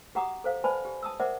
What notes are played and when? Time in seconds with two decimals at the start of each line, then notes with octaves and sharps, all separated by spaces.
0.15 F#4 G4 F#5 A#5 D6 D#6
0.44 A4 C5 F5
0.64 B4 C5 D5 G#5 A5 B5
0.85 G4
1.03 A5 D#6 E6
1.20 A#4 C5 D5 E5 F#5 D6